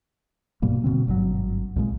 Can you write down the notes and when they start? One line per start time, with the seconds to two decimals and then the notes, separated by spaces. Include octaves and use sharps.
0.62 G2 B2 G3 A#3
0.84 B2 D3 C4
1.07 G#1 G2 C#3 F#3
1.76 C2 A#2 G#3